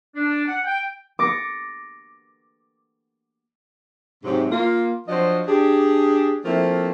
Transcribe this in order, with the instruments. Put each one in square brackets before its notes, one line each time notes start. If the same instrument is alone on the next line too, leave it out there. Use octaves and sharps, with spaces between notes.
[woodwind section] D4
F#5
G5
[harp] D6 A6 A#6 C#7
[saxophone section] G#2 C3 F#3
A#3 F4
F3 F#3 D4 F#4 C5 D#5
D4 G4 G#4
F3 A3 A#3 C4 E4